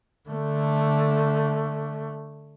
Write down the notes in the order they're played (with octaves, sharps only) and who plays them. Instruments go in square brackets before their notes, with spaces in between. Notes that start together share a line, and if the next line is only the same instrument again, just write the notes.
[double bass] D3 A3